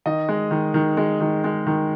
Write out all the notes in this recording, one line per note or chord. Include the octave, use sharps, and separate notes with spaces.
D#3 D#5
G#3
D#3
D#3
G#3
D#3
G#3
D#3